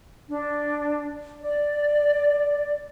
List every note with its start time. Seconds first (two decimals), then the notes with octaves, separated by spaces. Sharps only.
0.29 D4
1.41 D5